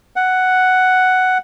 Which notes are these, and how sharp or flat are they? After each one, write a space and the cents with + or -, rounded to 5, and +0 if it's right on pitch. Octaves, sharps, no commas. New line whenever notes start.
F#5 +5